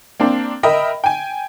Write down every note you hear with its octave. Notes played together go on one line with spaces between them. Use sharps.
A#3 C4 D4
A#4 D#5 E5 G5 B5
G5 G#5